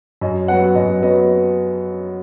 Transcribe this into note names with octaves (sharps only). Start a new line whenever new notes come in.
F#2 D#5
F#3 B3 F#5
F#2 D#5
F#3 B3 D#5